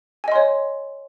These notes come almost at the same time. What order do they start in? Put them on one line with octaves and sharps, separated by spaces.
G#5 D#5 C6 C#5